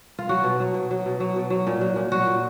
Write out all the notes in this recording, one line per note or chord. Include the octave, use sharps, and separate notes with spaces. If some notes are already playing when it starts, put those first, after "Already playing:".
F4
F#3 F#4
B2
F#3
B2
F#3
B2
F#3
B2
F#3
A#2
F#3
A#2
F#3 F#4
A#2